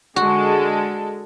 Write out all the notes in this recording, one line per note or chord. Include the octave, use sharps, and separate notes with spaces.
D3 G#3 F#4 A4